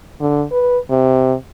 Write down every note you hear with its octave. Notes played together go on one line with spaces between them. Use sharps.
D3
B4
C3